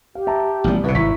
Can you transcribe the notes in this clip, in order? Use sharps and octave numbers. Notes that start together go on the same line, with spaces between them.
G4 F5
E5 A5 A#5
A1 B2 F3 G3
C2 A2 C3 B4
G#1 E4 A#5 C#6 B6